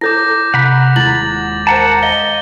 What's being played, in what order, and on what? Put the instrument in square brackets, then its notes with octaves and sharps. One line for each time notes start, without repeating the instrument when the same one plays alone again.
[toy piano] E4 A4 C#5 [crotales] D6 G6 A#6
[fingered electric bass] C3 [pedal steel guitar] F#5 A#5 B5
[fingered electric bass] D#1 G#3 [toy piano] E4 [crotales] A6 F#7
[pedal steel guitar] A#4 F#5 A5 [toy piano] C5 A#5
[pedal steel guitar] D#5 [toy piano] F5 [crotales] G7